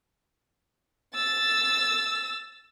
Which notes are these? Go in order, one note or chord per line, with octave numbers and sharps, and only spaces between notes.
E6 A6